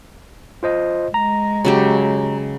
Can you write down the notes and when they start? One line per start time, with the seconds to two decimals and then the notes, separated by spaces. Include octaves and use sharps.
0.63 F4 C5 D#5
1.14 G#3 A#5
1.65 C#3 F#3 G4